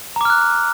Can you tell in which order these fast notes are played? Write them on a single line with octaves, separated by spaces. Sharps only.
A#5 D6 F6 F#6